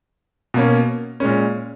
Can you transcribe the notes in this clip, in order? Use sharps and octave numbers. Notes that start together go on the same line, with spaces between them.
B2 A#3 C#4
A#2 G#3 C#4